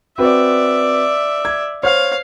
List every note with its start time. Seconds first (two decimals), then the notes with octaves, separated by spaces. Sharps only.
0.18 C4 F#4 B4 D5 E5
1.45 G#6
1.83 C5 C#5 F5